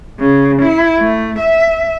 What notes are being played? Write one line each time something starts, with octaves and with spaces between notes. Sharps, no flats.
C#3
E4
A3
E5